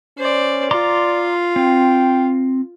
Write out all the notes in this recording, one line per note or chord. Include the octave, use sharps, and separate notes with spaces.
C#4 C5 D5
F4 D5 A#5 C6 D6
C4 G5